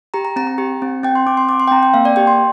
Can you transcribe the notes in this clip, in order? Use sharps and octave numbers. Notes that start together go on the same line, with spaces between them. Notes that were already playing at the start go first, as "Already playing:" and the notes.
G4 A#5
A#5
C4 A#5
A#5
G4
C4
C4 G5
C6
C4 D6
C6
C4 D6
C6
G5
C4 A#5
G5
A#3 F5
D5
G4 G5
C6